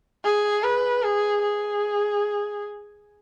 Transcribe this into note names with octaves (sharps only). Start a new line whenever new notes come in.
G#4
B4
G#4
G#4